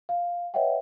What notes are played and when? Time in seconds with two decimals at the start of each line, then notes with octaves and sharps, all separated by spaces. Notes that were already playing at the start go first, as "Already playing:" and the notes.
0.09 F5
0.54 B4 C#5 D#5 E5 F#5 G5